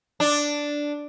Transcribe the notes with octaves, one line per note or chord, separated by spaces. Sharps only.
D4